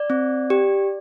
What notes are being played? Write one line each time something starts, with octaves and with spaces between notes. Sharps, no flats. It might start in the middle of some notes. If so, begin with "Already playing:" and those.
Already playing: D5
C4
G4